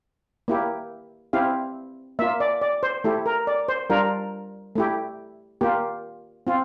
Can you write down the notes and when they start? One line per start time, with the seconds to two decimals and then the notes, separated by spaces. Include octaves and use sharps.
0.48 A#3 E4 G4
1.33 C4 E4 G4 F5
2.19 A#3 F4 E5
2.40 D5
2.61 D5
2.83 C5
3.04 A3 E4 G4 A4
3.26 A#4
3.47 D5
3.68 C5
3.90 G3 D4 F4 A#4
4.76 A3 E4 G4
5.61 A#3 F4 G4
6.47 C4 F4